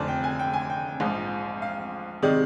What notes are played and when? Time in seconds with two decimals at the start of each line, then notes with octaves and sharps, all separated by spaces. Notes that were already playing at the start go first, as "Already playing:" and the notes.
Already playing: F1 F2 D3 C5 D5
0.08 G5
0.24 G#5
0.39 G5
0.53 G#5
0.70 G5
1.00 A#1 G#2 F3
1.62 F5
2.23 C3 D#3 G#3 D5